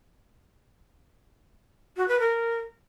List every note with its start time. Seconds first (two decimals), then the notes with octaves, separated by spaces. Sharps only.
1.97 F#4
2.08 B4
2.20 A#4